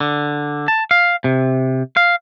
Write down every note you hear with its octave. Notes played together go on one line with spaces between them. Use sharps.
D3
A5
F5
C3
F5